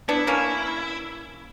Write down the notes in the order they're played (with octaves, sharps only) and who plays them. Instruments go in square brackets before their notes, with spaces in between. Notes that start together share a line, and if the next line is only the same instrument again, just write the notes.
[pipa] B3 D4 [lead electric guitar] E4
[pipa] A#3 C#4